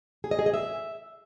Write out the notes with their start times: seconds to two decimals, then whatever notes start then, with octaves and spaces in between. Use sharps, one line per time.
0.24 G#4
0.31 D#5
0.39 G#4
0.46 D#5
0.54 E5